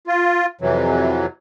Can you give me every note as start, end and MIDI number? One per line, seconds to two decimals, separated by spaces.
0.07 0.46 65
0.61 1.26 41
0.61 1.26 48
0.61 1.26 52
0.61 1.26 54